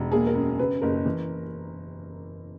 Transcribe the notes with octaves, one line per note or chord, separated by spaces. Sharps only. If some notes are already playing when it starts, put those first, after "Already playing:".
Already playing: E1
A#3 G#4
A#4
F#2
C#3 B4
F#1 A#4
E3